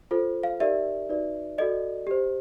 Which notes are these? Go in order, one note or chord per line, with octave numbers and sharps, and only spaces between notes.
F4 A4 C5
F5
D#4 G4 A#4 D5 E5
D#4 F#4 B4 D5
F#4 A4 D5 D#5
G4 C5